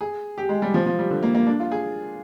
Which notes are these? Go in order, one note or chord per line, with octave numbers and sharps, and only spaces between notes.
G#4
G4
G#3
G3
F3
F3
G3
D3
A#3
A#3
D4
F4
G#4